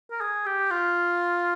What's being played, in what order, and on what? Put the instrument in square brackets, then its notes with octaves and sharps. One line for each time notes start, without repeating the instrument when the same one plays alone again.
[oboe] A#4
G#4
G4
F4